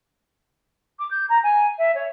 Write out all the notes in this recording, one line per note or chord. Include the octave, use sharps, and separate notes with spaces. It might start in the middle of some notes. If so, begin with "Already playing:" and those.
D6
G6
A#5
G#5
E5
C#5